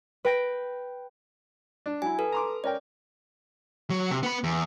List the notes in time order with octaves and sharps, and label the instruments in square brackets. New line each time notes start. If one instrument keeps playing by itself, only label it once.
[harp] B4 G5 A#6
[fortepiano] D4
[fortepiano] F#3 E4 [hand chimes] G#5
[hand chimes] A4 B4
[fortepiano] A#5 C6 D6
[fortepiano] C#4 A#4 G5 [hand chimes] D5
[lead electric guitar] F#3
C3
B3 B5
E2